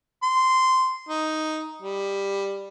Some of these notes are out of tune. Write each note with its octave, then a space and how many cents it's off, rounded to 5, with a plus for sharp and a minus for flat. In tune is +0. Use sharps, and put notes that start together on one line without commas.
C6 -10
D#4 +5
G3 +10